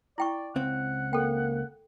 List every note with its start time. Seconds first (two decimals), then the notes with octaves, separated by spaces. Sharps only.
0.18 E4 D5 G5 C#6
0.56 C#2 C4 F#5
1.13 A#3 A4 G5